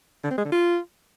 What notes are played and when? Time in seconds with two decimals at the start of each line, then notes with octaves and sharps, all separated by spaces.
0.24 D3
0.31 C4
0.38 G#3
0.45 D3
0.52 F4